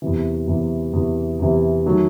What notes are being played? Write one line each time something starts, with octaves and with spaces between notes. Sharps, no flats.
E2 C3 E3
E2 C3 E3
E2 C3 E3
E2 C3 E3
D#3 F#3 A3